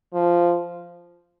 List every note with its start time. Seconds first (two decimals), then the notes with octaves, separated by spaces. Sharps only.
0.13 F3